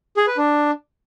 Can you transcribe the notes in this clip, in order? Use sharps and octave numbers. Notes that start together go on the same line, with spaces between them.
G#4
B4
D4